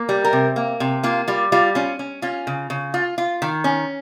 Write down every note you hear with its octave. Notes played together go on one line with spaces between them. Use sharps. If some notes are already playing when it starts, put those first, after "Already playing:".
Already playing: A#3
G3
A#4
C3
A#3
C3
A#3 F4
G3 F4
G3 F4
C#4 F4
C#4
C#4 F4
C#3
C#3
F4
F4
D#3
C#4